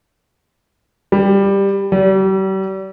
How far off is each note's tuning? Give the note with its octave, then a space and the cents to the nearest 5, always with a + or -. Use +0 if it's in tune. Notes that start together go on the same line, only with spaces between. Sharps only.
G3 +10
G3 -40